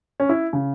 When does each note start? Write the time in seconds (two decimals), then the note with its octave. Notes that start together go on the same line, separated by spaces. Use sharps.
0.20 C#4
0.29 E4
0.53 C#3